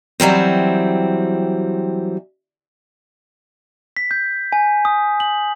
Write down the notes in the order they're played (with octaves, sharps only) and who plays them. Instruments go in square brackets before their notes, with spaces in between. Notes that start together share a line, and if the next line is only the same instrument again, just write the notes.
[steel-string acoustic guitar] E3 F#3 G3 C4
[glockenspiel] B6
G6
G#5
D#6
F#7